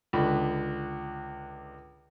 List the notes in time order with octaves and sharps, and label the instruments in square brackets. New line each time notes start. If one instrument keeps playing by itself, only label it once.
[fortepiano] C#2 D3 B5